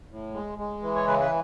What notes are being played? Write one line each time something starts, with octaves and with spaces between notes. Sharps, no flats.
A2
G#3
G#3
E3
C#5
C#3 B4
B4